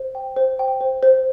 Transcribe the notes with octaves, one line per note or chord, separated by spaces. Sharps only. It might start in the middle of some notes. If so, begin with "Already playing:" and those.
Already playing: C5
G5
C5
G5
C5
C5